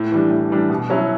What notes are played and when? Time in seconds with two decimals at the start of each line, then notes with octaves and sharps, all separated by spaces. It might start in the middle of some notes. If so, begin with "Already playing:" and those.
Already playing: A2
0.11 E3 G3 D4
0.31 A2
0.50 E3 G3 D4
0.70 B2
0.90 F#3 C#4 E4